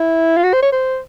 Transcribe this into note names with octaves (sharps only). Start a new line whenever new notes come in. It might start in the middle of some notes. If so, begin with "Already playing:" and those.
Already playing: E4
F4
F#4
C5
C#5
C5